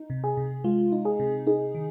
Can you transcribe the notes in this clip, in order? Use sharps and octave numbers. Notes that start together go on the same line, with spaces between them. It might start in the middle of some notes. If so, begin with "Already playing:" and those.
Already playing: D#4
C3
G#4
C3
G#3 F4
D#4
G#4
C3
D#4 G#4
D#3